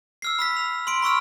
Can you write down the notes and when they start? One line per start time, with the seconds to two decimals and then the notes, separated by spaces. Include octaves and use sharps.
0.22 E6 F6 C7
0.39 B5 E6 B6
0.57 F7
0.87 C6 D7
1.02 B5 C#6 E6 F6